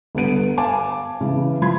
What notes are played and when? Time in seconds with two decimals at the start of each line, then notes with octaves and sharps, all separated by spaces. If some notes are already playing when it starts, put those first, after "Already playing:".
0.15 G1 G2 B3 D7 D#7
0.58 F5 G#5 A5 D6
1.21 C#3 E3
1.62 F3 B5 C6 G#6